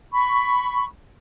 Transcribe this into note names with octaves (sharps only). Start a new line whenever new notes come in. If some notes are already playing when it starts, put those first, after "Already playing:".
B5 C#6